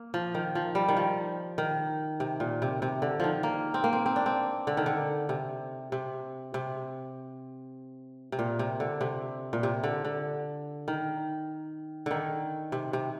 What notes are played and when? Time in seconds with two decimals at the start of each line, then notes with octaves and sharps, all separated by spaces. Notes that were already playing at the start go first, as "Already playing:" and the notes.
Already playing: A#3
0.14 F3
0.35 D#3
0.55 F3
0.75 G3
0.88 D#3
0.97 F3
1.58 D#3
2.20 C3
2.40 A#2
2.62 C3
2.82 C3
3.02 D3
3.20 D#3 F3
3.43 A#3
3.74 C4
3.84 A#3
3.93 C4
4.06 C4
4.16 D4
4.26 C4
4.67 D3
4.77 D#3
4.86 D3
5.29 C3
5.92 C3
6.54 C3
8.32 C3
8.39 A#2
8.59 C3
8.80 D3
9.01 C3
9.53 A#2
9.63 C3
9.84 D3
10.05 D3
10.88 D#3
12.06 D3 D#3
12.72 C3
12.93 C3